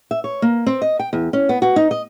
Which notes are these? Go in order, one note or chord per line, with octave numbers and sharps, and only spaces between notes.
E5
C#5
A#3
C4
D#5
G5
E2
C#4
B3
F#4
D#4
D#5